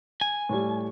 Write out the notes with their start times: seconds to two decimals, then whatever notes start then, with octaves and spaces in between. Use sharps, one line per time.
0.21 G#5
0.49 A2 G3